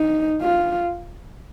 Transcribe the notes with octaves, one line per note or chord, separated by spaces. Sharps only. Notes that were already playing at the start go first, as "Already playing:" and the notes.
Already playing: D#4
F4